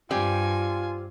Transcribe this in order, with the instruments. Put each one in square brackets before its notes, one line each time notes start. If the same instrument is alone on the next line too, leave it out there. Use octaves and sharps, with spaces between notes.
[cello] G2 [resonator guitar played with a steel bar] C4 G4 D5 [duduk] F4 [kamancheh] G#5